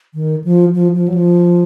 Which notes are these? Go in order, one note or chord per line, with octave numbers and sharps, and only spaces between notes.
D#3
F3
F3
F3
F#3
F3